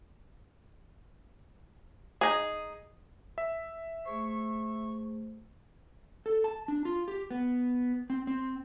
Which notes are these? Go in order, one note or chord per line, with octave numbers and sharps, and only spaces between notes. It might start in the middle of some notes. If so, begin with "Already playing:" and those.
D#4 G#4
E5
A3 G#4 C5 C#6
A4
A5
D4
F4
G4
B3
C4
C4